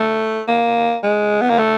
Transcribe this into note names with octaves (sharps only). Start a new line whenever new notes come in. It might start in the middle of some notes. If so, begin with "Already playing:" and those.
Already playing: A3
A#3
G#3
B3
A#3
A3